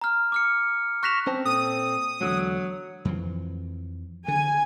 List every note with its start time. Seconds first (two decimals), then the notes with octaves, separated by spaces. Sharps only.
0.01 A#5 F6
0.32 D6 F6 C#7
1.03 C#6 F#6 A#6 B6 E7 F7
1.27 C4 C#4 C5 A5
1.45 A#2 A4 D#6
2.21 E2 D3 F#3 G#3
3.05 F2 E3 F3
4.28 D3 G#5